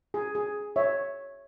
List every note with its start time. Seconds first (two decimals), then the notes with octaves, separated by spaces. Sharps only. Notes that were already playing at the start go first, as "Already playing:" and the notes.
0.14 G#4
0.35 G#4
0.76 C#5 E5